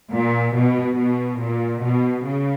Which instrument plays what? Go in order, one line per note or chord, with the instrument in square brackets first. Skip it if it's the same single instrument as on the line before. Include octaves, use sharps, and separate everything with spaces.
[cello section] A#2
B2
B2
A#2
B2
C#3